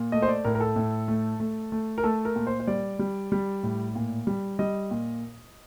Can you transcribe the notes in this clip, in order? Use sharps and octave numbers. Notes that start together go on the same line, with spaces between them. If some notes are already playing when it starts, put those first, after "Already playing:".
Already playing: A#2
A3 D#5
C5
D5
A2 A#4
A#4
A4
A2
A3
A3
A3
A#4
A3 A4
A#4
A#2
C5
C5
G3 D5
G3
G3
A2
A#2
G3
G3 D#5
A#2